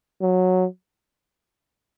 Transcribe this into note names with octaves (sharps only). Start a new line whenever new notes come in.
F#3